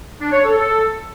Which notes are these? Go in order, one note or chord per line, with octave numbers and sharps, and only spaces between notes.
D4
C#5
A4
A4